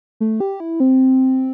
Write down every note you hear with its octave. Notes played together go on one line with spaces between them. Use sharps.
A3
G4
E4
C4